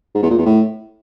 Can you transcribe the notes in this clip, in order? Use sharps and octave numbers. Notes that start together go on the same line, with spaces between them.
G#2
E2
A#2
E2
A2